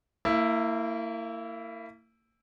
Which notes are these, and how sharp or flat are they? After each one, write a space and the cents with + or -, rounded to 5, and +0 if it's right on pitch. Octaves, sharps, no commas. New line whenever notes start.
A#3 -35 E4 +0